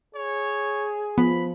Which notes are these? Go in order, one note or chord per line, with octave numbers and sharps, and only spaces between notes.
G#4 C#5
F3 B3 B5